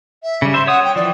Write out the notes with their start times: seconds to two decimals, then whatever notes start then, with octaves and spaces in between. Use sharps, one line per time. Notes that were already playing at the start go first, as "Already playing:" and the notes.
0.23 E5
0.42 C#3 G3
0.54 C5 E5 C6
0.67 C#5 F#5 D#6
0.84 G5
0.96 E3 F3 D5